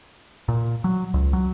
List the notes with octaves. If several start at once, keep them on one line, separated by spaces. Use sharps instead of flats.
A#2
F#3
C#2
F#3